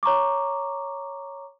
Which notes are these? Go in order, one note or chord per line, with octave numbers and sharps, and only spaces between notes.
C#5 A#5 C#6 D6